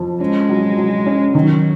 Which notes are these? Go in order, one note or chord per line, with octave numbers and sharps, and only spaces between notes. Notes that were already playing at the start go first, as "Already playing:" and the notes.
Already playing: F2 F3
G#3 C#4
F#3
F#3
C#4
D#3 F#3